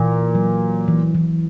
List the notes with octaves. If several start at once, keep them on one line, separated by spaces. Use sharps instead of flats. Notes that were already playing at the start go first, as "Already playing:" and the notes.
Already playing: A#2 E3
F#3
E3
E3